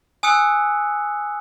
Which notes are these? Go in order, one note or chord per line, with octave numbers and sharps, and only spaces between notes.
G#5 D#6 E6 F#6 C#7